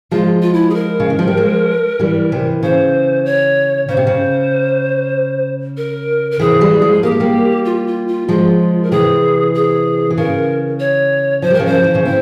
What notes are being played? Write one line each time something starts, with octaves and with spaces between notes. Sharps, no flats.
F3 G#3 F4
F4
E4
G#4
A#4
C#3
E3
F3
G3
F3 G#3
E3 G3
C3 E3
C#3 C5
C#5
C#3 C5
C3
C#3
A#4
A#4
C3 E3 G#4
E3 G3
F3 G#3
A#3 G4
G#3
G3 A#3
F4
F4
F4
F3 G#3 F4
A#4
C3 E3 G#4
G#4
E3
C#3 A#4
C#5
F3 C5
G3
A#4
C#3 F3
C5
F3
E3
C#3 F3
C4 E4 C5